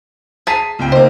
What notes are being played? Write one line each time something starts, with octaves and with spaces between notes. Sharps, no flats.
G#4 A5 A#5 B6 C7 D#7
C#2 C3 G5
A#3 D#4 C5